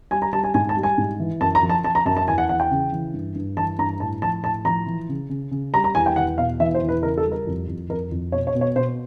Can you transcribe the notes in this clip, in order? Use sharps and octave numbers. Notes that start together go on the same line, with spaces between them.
G3 G#5
A#5
G3 A5
G#5
G#2 G#5
A5
G3
G#5
G#2
E3
F#2 A5
A#5
F3
A5
F3 A5
A#5
F#2 A5
A5
E2 G#5
F#5
E3 F#5
G5
C#3
E3
G2
G2
E3 A5
G2 A#5
A2 A5
F3 A5
A2 A5
F3 A#5
E3
C#3
C#3
C#3
G3 A#5
A#5
E2 G#5
G5
E2 F#5
B2 F5
E3 E5
C5
E2
B4
C#3 A#4
A4
G3
A#4
F2
F2
F2 A#4
F2
B2 C#5
C#5
B2
C#5
B2 C5